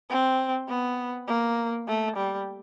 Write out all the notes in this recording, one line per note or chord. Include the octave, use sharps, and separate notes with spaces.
C4
B3
A#3
A3
G3